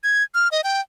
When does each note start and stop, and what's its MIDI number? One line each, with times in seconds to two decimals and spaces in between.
0.04 0.23 92
0.34 0.48 89
0.52 0.61 75
0.64 0.81 79